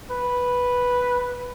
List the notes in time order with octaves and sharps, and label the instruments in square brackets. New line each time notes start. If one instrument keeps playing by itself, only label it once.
[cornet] B4